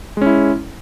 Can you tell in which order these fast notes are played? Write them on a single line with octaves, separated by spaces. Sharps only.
G#3 C#4 E4